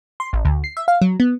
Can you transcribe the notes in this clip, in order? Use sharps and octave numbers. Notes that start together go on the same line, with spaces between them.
C6
A1
D2
C7
E5
F5
F#3
B3